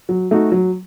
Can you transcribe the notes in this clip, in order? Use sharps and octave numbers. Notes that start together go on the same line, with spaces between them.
F#3
A3 D#4 F#4
F#3